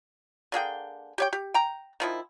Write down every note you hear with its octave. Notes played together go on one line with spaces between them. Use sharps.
D3 A#3 G#4 G5
G4 C#5 G5
G4
G5 A#5
D#3 F3 E4